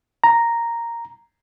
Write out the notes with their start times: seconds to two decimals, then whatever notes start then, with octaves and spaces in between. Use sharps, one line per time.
0.24 A#5